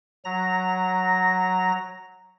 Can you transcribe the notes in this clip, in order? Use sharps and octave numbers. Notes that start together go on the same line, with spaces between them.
F#3 A#5 A#6